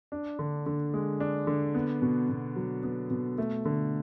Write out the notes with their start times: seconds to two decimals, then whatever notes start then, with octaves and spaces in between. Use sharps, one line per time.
0.12 D4
0.39 D3
0.66 D3
0.94 G#3
1.20 D4
1.47 D3
1.75 B3
2.02 B2
2.29 B2
2.56 F#3
2.83 B3
3.11 B2
3.38 A3
3.65 D3